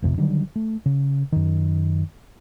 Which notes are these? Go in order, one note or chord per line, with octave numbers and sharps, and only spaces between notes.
A1 F2 C3
D3 D#3 F#3 G3
A3
C#3
F#2 D#3